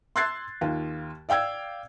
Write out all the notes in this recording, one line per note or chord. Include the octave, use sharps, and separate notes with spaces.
C6 E6 F#6 G#6 A6 C7
D#2 F4
D5 F5 G5 E6 G#6